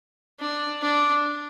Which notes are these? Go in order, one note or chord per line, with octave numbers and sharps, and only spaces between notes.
D4
D4